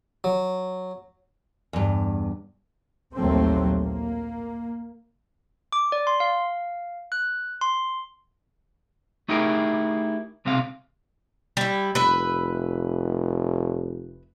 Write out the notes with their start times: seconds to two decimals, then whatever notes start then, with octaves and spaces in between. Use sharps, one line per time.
0.24 F#3
1.73 E2 G2
3.15 A#1 D#2 F#3 A3 A#3 C4
3.80 A#3
5.72 D6
5.92 D5
6.07 C6
6.20 F5
7.12 F#6
7.61 C6
9.28 A3 D#4 E4 G4 G#4 A#4
10.45 B1 C3 G#3 C4 F5
11.57 G3 E4
11.95 F1 B4 E5